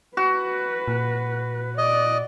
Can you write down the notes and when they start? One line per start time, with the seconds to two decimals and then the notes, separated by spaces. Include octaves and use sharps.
0.17 F#4 B4
0.88 A#2
1.78 D5 D#5